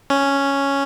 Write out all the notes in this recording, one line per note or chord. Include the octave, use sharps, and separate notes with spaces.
C#4